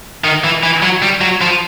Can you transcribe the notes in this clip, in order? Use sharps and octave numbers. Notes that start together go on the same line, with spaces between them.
D#3
E3
E3
F#3
G3
F#3
F3